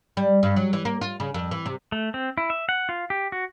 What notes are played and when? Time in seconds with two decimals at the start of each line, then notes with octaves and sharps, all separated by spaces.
0.17 G3
0.43 G2
0.56 F#3
0.73 E3
0.85 A#3
1.01 F4
1.20 C#3
1.34 F2
1.51 E3
1.66 C3
1.92 A3
2.14 C4
2.38 E4
2.50 E5
2.69 F#5
2.89 F4
3.10 G4
3.32 F#4